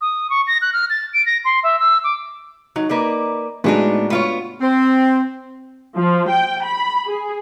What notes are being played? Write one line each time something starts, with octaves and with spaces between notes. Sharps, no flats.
D#6
C#6
A#6
F#6
F6
A6
D7
A#6
C6
E5
E6
D6
F#3 D#4
A#3 B4 D5
A2 G#3 B3 D4 D#4 F#4
B3 F4 C#5
C4
F3
G5
B5
G#4